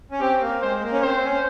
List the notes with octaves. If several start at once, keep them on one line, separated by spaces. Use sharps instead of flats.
C#4
C4 G4
A#3
G#3 C5
A#3
C#4
C4 C5
C#4